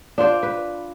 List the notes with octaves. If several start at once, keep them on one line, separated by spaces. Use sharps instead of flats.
D4 F4 C5 D5
B4